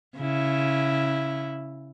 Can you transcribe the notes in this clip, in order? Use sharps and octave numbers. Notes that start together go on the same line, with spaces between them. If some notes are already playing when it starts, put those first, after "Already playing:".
C#3 E4